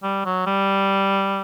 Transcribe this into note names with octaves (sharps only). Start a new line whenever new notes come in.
G3
F#3
G3